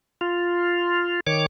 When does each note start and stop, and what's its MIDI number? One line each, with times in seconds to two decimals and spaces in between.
0.21 1.20 65
1.27 1.46 51
1.27 1.46 73
1.27 1.46 86